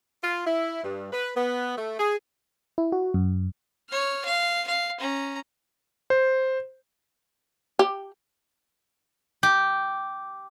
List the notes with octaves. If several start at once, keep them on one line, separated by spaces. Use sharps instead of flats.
F4
E4
G2
B4
B3
A3
G#4
E4
F#4
F#2
C#5 F6
F5
F5
C#4 A#5
C5
G4
G4